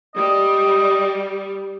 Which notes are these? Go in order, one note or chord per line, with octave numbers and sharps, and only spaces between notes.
G3 D#5